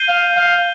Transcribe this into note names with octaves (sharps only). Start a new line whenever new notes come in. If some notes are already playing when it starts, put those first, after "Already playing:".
Already playing: G6 C7 D#7 G7
F5
F5